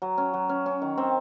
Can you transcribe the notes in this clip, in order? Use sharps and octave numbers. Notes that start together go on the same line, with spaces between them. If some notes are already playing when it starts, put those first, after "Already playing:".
F#3
C#4
F#3
C#4
C#4
D#3
C4